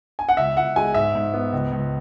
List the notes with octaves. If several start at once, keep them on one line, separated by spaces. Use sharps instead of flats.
G#5
F#5
C#2 E5
C#2 F#5
G#3 G#5
G#2 E5
G#2
B3
C#2
C#2